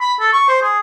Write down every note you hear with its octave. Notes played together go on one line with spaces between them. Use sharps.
B5
A4
C#6
C5
G#4